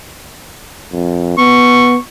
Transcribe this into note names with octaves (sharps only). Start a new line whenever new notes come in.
F2
B3 C#6